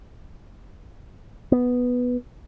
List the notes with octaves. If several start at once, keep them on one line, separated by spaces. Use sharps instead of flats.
B3